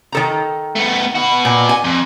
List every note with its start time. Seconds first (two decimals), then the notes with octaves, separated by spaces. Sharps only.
0.12 D#3 A4 A#5
0.75 A3 B3
1.15 F#4 B4
1.45 A#2
1.69 G#5
1.84 F2